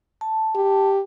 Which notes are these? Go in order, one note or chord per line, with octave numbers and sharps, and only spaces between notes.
A5
G4